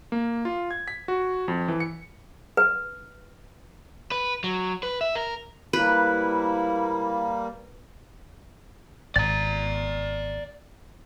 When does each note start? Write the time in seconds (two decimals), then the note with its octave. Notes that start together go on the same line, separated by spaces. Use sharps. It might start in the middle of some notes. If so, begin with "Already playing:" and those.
0.12 A#3
0.45 F4
0.71 G#6
0.88 B6
1.08 F#4
1.48 F2
1.68 E3
1.80 C#7
2.57 B4
4.12 B4
4.44 F#3
4.83 B4
5.01 E5
5.15 A#4
5.73 F3 G3 A3 A#3 E4 B4
9.16 G#1 D5 A#5 A6